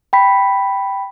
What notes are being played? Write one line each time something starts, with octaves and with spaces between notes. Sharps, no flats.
G5 B5 B6